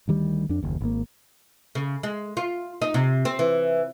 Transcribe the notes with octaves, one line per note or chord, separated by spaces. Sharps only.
D2 D#3 G3
F2 D4
F#1 D#2
G#1 A#3
C#3
G#3
F4
D#4
C3
C4
E3